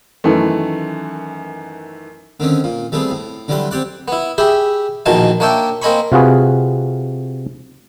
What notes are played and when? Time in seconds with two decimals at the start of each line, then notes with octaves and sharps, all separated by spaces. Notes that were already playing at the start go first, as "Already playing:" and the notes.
0.24 F#2 D#3 E3 A3
2.40 D3 D#3 C4 C#4
2.64 A#2
2.92 G3 A3 B3 C4 G#4
3.11 A2
3.48 D3 E3 F#3 G3 A3 C6
3.71 C4 G4 D5 F#5
4.08 B3 E4
4.38 G4 G#4 E5 B5
5.06 A#1 B2 D#3 E3 G#5 A5
5.40 A#3 D4 C#5 D5 E5 G5
5.82 A#3 C4 D#5 G#5 B5 C#6
6.12 C3 F4 F#4 G#4 B4